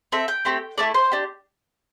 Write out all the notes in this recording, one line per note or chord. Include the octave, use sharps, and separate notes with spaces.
C4 A4 E5
G5
A3 C4 G4
A3 E4 A4 D5
C5
D4 G4